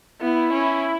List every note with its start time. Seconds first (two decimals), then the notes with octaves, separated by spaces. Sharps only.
0.21 B3 E4
0.53 C#4